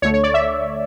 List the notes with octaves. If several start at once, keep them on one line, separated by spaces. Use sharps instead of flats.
D2 D3 A3 C#5
C#5
D5
E5